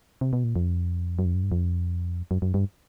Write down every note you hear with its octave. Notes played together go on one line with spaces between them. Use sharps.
C3
B2
A#2
F2
F#2
F2
F#2
G2
F2
F#2
F#2
G2